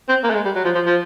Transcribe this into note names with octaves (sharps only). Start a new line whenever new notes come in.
C4
A#3
A3
G#3
G3
F#3
F3
F3
F3